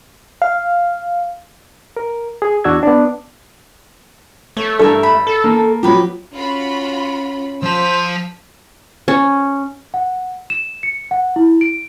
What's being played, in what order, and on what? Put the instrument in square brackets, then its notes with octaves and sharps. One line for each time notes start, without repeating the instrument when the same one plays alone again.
[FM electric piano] F5
[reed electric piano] A#4
G#4
E2 D4 F#4 D5 E6 G#6
B3 D4
[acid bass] A3 [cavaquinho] C#5
[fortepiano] G2 A4 [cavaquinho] A#4 C#5 E5
[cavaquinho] B5
[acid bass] A4
[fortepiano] A#3
[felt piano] F3 F#3 [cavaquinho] G4 B4 B5
[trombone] C#4 [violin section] F4 F#4 B5
[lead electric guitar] F3 A5 [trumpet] C5 [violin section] E6 B6
[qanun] C#4
[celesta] F#5
E7
C#7
F#5
E4
D7